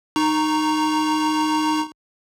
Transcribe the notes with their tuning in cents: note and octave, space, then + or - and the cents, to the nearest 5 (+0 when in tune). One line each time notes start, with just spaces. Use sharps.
D#4 -15 A#5 +0 C#6 +0